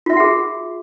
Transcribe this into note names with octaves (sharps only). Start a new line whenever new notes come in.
F4 F#4 G#4 E5 F#5